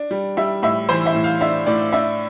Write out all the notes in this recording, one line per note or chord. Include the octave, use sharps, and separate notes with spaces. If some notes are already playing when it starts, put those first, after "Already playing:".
Already playing: D4
G3
G3 E5
A2 E5
E3 C5
E5
A2
F5
D4 E5
A2 D5
D4 E5